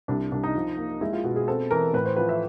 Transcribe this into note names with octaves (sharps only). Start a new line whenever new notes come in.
C2 D4
C2 D4
D#4
F3
A#3
G#3 E4
F4
B2 F#4
G#4
C4 A4
E3 A#4
A2 B4
C5
F3 B4
E5